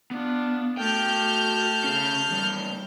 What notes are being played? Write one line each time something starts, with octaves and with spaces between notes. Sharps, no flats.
B3 D4 F4
A3 F#4 G5 A5 F6 G6
C#4 G#4
E2 G3